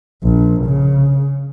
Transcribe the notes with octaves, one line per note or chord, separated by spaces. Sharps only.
A#1
C#3